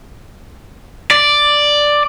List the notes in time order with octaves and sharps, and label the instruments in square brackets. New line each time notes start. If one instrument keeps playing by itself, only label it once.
[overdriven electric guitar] D5